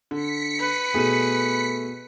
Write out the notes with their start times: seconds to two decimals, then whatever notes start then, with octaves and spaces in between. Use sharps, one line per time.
0.11 D3 B6 C#7
0.59 B4
0.94 B2 A3 G#4 D#7